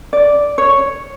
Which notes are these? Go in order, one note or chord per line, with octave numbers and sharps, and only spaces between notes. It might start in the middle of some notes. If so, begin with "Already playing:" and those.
D5
C#5